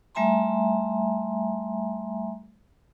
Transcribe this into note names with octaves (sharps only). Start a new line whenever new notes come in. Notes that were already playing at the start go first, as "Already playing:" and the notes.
G3 A3 E5 G#5 A#5 C6